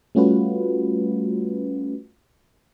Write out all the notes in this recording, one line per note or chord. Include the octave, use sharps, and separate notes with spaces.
G3 A3 C#4 F4 F#4 B4